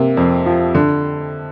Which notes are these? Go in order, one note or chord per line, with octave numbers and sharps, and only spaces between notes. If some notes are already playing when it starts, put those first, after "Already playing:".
Already playing: C3 A#3
F2
F3
D3